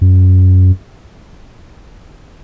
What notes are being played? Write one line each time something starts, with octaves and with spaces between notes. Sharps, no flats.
F#2